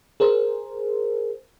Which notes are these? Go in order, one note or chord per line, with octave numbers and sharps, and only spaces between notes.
G#4 A#4 C5